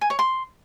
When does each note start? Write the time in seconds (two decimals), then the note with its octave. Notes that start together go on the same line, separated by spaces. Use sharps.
0.01 G#5
0.10 C#5
0.19 C6